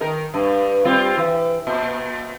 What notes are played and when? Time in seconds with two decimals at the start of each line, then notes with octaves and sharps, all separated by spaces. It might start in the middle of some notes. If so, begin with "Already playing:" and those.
0.01 D#3 A#4
0.34 G2
0.85 G3 C4 F4
1.17 E3
1.67 A#2